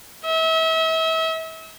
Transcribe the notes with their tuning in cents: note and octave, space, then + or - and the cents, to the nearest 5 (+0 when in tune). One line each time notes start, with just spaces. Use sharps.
E5 -35